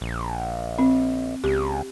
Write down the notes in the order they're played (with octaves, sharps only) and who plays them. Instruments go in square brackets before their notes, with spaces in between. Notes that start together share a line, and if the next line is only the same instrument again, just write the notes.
[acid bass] A#1
[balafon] C4
[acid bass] C#2 [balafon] G4